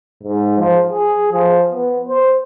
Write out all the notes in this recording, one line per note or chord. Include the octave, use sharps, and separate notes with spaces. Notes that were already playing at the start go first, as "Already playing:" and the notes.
G#2
F3
G#4
F3
B3
C5